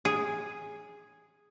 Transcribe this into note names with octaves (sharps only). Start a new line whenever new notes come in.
G#4